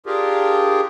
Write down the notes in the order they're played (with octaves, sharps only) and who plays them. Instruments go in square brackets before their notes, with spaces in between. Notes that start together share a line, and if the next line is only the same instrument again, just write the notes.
[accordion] D4 F4 G4 G#4 A#4